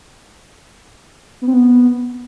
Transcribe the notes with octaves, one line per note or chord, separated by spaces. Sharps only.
B3
C4
B3